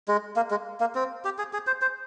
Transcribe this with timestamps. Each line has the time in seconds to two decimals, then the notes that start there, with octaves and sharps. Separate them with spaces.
0.08 G#3
0.36 A#3
0.51 G#3
0.80 A#3
0.95 C4
1.25 G4
1.38 G#4
1.53 G#4
1.67 C5
1.82 C5